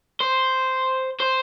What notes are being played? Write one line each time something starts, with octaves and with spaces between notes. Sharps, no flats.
C5
C5